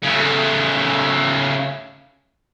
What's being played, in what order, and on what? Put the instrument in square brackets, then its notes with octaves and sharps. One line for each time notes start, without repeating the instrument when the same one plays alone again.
[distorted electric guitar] C#3 A3